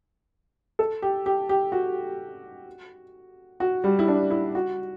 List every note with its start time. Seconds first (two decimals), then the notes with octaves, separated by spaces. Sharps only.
0.79 A4
1.02 G4
1.26 G4
1.49 G4
1.72 F#4
3.60 F#4
3.84 G3
3.99 E4
4.08 D4
4.30 E4
4.55 F#4